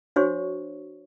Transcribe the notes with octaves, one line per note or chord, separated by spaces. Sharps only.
D4 F#4 C5 C#5 C#6